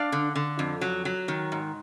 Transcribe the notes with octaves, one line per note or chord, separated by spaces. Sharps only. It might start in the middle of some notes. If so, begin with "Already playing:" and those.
Already playing: D4 D5 F5
D3
D3
F2
F#3
F#3
D#3
G#2